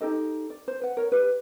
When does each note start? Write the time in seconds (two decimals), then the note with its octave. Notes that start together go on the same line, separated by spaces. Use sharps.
0.01 D#4 G4 A4 D#5
0.50 D5
0.68 C5
0.82 B4 F#5
0.97 A#4 C#5
1.12 G4 B4